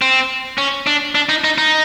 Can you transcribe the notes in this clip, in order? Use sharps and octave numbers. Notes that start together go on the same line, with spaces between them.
C4
C#4
D4
D4
D#4
D#4
D#4